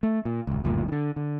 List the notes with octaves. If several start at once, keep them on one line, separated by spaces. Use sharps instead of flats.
A3
A#2
D#1 C#2
F#1 D2 G2 A#2
D3 D#3
D3